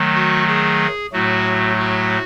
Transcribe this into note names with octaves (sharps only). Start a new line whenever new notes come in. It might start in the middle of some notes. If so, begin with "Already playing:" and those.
Already playing: D#3 F#3 A3
F#4
G#4
A2 F#3 A3 F#4
F#4